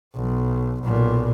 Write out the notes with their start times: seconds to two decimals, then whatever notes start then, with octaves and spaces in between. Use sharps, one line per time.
0.15 B1
0.84 B1 A#2